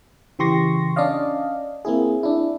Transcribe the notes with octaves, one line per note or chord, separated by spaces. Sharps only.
C#3 E3 G4 C6 C#6 A#6
C#4 D4 D5 D#5 F5
A#3 C4 E4 G#4
D4 E4